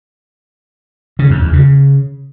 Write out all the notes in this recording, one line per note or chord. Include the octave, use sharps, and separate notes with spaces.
C#3
F2
E2
C#3